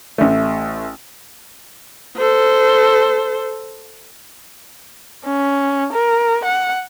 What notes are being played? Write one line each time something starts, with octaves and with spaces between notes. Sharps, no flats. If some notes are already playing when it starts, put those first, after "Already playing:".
A1 A3
A4 C5
C#4
A#4
F#5